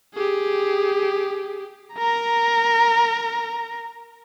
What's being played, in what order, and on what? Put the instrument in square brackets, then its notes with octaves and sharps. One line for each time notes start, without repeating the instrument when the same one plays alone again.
[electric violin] G4 G#4
A#4 A#5